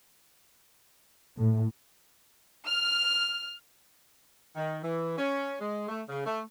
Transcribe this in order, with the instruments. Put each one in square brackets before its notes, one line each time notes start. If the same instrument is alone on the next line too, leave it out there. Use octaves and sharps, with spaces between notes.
[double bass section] A2
[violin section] F6
[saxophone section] D#3
E3
C#4
G#3
A3
C#3
A3